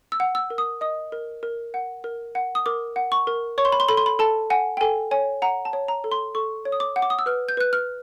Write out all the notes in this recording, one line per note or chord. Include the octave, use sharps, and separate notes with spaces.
E6
F#5
E6
A#4
D#6
D#5 D#6
A#4
A#4
F#5
A#4
F#5
D#6
A#4 D6
F#5
C#6
A#4
C#5 C#6
C6
B5
C6
A4 B5
C6
B5
A4 A5
F#5 G#5
G5
A4 G#5
C#5 G#5
F#5 A#5
A5
C#5
A#5
A4
C6
A4 C#6
C#5
D#6
D6
F#5
D6
D#6
E6
B4 F6
G6
B4 F#6
F6